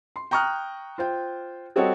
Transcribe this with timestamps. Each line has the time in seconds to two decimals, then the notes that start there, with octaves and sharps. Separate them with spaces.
0.16 C6
0.31 G5 A#5 C#6 D#6 F6 F#6
0.98 F4 C5 G5
1.76 G3 C4 F#4 A4 C#5 D#5